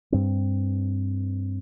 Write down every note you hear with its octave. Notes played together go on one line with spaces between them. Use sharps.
G2 C4